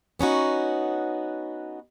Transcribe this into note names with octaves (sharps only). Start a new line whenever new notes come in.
B3 C#4 D#4 F#4